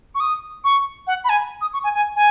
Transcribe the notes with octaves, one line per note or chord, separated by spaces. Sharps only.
C#6
D#6
C#6
F#5
B5
G#5
D#6
C#6
G#5
G#5
G#5